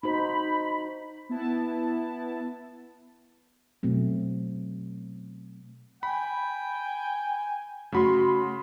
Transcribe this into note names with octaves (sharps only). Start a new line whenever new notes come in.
D#4 F#4 C5 B5
B3 E4 A5
B2 F#3 A3 C4
G5 G#5 B5
C#3 A3 F#4 B5 C6